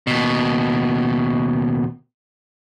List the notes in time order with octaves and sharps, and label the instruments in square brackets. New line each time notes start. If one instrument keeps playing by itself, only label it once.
[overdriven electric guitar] D#2 B2